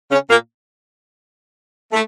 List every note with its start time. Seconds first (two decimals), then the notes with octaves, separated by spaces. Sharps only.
0.11 C#3 C#4
0.30 A#2 A#3
1.92 A3